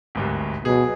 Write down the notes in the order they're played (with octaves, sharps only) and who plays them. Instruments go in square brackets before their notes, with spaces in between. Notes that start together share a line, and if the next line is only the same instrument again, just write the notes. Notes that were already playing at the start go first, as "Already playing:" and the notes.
[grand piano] G#1 D2 G2
[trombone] B2 [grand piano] F#3 G#4